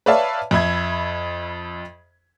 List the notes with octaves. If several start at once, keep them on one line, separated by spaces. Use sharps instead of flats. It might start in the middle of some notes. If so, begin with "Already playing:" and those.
B4 C#5 D5 E5 F5 A5
F2 E5 B5 G#6